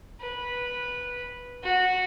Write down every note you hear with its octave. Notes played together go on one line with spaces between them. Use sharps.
B4
F#4